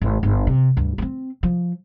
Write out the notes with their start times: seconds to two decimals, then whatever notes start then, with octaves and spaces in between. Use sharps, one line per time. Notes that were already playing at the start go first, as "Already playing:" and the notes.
0.02 G#1
0.23 G1
0.47 C3
0.77 D2 G2
0.98 F#3 C4
1.43 F3